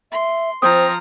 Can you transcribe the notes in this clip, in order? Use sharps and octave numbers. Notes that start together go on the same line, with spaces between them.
E5 C6
F3 C4 C5 A#5 D#6 G6